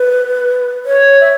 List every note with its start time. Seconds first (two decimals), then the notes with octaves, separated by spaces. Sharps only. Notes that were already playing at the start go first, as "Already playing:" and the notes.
Already playing: B4
0.85 C#5
1.20 E5